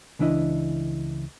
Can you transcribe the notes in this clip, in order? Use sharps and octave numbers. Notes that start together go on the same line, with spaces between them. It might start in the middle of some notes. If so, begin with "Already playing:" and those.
C#2 E3 D4 E4 D#5